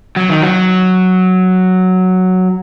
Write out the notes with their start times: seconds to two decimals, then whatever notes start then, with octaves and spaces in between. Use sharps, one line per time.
0.16 F#3
0.30 D#3
0.42 F#3